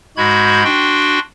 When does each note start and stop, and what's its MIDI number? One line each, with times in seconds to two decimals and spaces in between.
0.17 0.64 44
0.17 0.64 56
0.17 0.64 66
0.17 0.64 83
0.17 0.64 91
0.17 0.64 92
0.64 1.19 62
0.64 1.19 66
0.64 1.19 79
0.64 1.19 84